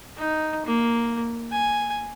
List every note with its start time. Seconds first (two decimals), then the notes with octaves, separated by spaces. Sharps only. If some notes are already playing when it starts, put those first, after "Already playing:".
0.17 D#4
0.66 A#3
1.51 G#5